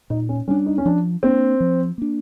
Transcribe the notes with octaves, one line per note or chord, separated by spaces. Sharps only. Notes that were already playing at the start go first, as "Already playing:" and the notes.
A#2 D#4
C#4
G3 B3 C#4 D4
D#4
C#4
F3 D4
A#3 C4 D4
F3
A#3 D4